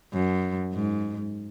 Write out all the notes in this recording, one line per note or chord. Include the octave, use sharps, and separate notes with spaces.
F#2
G#2